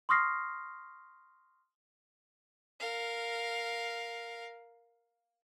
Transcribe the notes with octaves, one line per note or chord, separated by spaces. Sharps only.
C6 C#6 D#6 F6 A#6 C7
A#4 F5